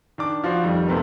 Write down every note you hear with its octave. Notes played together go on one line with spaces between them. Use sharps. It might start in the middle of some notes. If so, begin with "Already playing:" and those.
D#3 D4 D6
F3 F4 F#4 C5 D5
F2 D#3 G3
B1 C3 A3 B3 C4 A#4